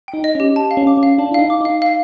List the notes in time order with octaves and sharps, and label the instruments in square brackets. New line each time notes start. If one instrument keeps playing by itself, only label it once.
[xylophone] G5
[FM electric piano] D#4
[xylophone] D#5
[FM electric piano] C#4 [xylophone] G4
[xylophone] A5
F5
[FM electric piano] C#4
[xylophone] D6
[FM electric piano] C#4
[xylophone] F5
[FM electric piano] D4 [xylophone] A5
[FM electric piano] E4
[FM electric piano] D#4 [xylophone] F5
[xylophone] D6
[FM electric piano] D#4 [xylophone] F5
[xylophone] F5